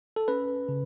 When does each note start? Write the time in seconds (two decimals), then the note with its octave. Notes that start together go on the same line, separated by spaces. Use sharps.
0.16 A4
0.28 C#4 B4
0.69 C#3